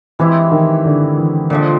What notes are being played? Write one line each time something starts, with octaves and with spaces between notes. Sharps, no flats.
E3 G#3 C4 E4 G4
D#3
D3
E3
A#2 D3 F3 G#3